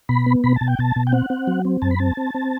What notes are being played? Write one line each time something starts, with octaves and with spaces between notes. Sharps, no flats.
B2 B5
B3
B2 B5
A5
B2
G5
B2 A5
B2
G5
C4 F#5
C4
F#3
C4
F#2 A5
B5
C4 A5
C4
C4